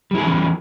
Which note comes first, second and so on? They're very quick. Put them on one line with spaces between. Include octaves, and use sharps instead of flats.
G3 E4 G#4 E3 C#4